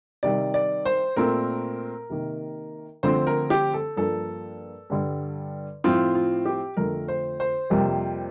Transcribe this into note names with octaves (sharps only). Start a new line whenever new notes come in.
C3 D#3 G3 D5
D5
C5
A#2 A3 C4 A#4
C3 D#3 A#3
D3 F3 A3 C4 C5
A#4
G4
A4
G2 F3 A#3 A4
G2 D3 G3
A2 F3 C4 F4
F4
G4
F2 D3 A3 A#4
C5
C5
F2 C3 G3 A#3